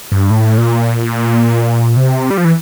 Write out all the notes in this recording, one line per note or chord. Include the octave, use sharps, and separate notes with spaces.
G2
A2
A#2
C3
G3
F3
E3